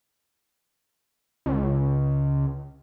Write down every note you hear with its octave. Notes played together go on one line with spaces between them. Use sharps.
C#2